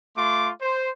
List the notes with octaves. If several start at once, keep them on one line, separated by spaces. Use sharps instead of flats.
A3 F4 C6 D6
C5